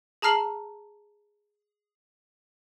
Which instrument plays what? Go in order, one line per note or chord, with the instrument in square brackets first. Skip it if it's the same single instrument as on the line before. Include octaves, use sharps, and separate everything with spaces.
[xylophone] G#4 A5 A#5 F6 C7 F#7